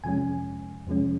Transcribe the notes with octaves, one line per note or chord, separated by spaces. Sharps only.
F2 C3 F3 G#3 C#4 G#5
F2 C3 F3 G#3 C#4